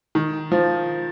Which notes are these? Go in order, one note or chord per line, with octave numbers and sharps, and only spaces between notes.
D#3
F3